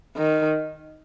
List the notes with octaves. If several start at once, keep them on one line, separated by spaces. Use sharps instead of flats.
D#3